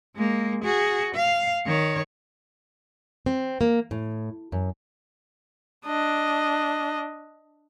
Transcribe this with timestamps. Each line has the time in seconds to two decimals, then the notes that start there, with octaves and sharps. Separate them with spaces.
0.16 G#3 A#3
0.64 F#4 G#4
1.15 F5
1.66 D#3 C#5
3.26 C4
3.61 A#3
3.91 A2
4.52 F#2
5.86 D4 D#5